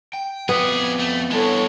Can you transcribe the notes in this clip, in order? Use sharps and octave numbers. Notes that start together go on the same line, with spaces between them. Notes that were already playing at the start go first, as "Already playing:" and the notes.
G5
F2 G3 B3 G#4 D5
A3
G2 D3 E3 G#3 A4 C#5